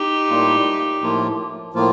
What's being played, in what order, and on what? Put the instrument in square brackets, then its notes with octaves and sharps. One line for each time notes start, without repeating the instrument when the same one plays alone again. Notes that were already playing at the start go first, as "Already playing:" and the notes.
Already playing: [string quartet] D#4 G4
[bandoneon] A2 G3 A#3 F4
A2 F3 A#3 F4
A2 F3 A#3 F4